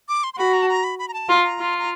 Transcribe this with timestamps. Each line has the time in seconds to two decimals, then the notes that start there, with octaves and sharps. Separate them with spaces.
0.09 D6
0.24 C6
0.34 C6
0.38 F#4 B5
0.53 A#5
0.62 A5
0.69 A#5
0.84 B5
0.99 B5
1.08 A#5
1.14 A5
1.29 F4 A#5
1.44 A#5
1.60 F4
1.79 A#5